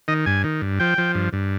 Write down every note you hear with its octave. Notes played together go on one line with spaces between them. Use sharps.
D#3 D#5
G2 G#5
D#3
G2
F3 G5
F3
G2
G2